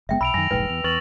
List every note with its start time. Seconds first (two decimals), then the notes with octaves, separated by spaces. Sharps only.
0.09 F#1 G#3 B3 E5 G5
0.21 B1 B5 E6 D7 F7
0.34 F#2 D#3 G#5 A#6
0.51 E1 A#1 G#2 B4 G5
0.69 E2 F7
0.84 E2 B4 C#6 A6 F#7